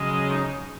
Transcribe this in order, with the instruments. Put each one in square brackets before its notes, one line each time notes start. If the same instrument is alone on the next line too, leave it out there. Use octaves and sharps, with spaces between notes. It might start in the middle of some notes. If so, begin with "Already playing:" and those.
Already playing: [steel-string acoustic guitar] C#3 F#3 C#4 [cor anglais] G#3
[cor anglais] D#4